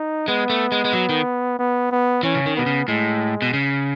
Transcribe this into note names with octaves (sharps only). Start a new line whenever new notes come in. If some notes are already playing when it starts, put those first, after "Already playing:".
Already playing: D#4
G#3 B3
A3
G#3
G#3
F#3
D#3
B3
B3
E3 C#4
C#3
D#3
B2 B3
C#3
A2 G#3
B2
C#3